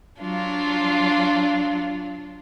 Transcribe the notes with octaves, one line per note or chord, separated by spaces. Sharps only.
F#3 D4 F4